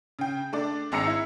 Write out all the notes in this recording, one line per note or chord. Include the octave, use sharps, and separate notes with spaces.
C#3 G5
A3 D4 D5
G#1 G#3 C4 A#5 E6 C#7
E4